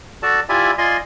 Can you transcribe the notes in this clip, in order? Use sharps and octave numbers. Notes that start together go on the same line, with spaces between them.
F#4 A4 D5 A5
E4 F4 G4 D5 E5 G#5
F4 D5 D#5 G#5 C6